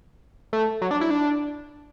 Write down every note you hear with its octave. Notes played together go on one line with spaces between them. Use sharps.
A3
F#3
D4
E4
D4